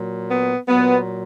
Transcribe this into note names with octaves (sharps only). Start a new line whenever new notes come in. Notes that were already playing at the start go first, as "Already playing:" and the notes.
Already playing: A#2 F#3
B3
A#2 F#3 B3